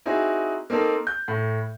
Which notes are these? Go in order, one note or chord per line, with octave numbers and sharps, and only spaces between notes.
C4 D#4 E4 F#4 G#4
A#3 C4 D#4 A4 A#4
G6
A2